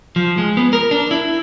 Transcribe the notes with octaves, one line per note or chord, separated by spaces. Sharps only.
F3
G#3
B3
A#4
D4
E4